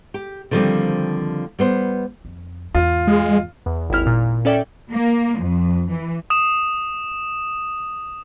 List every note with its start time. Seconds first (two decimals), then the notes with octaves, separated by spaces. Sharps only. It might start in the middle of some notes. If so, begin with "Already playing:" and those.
0.14 G4
0.51 D3 D#3 F3 G3 C4 G4
1.59 G3 B3 C5
2.25 F2
2.75 E2 G#2 F4
3.07 G#3
3.66 E2
3.90 G#1 D#2 E4 F6
4.07 A#2
4.45 C#4 A4 D5 E5 G5
4.92 A#3
5.38 F2
5.90 E3
6.30 D#6 E7